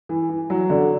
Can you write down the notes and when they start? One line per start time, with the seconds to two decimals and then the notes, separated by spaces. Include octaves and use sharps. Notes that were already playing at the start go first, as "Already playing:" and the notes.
0.09 E3
0.29 E3
0.50 F#3
0.70 D3